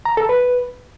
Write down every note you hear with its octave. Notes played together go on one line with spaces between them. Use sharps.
A#5
A4
B4